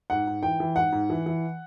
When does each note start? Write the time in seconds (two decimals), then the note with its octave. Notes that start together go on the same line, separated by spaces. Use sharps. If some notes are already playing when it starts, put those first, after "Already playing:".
0.10 G#2 F#5
0.27 G#2
0.43 E3 G5
0.60 E3
0.76 G#2 F#5
0.92 G#2
1.10 E3
1.26 E3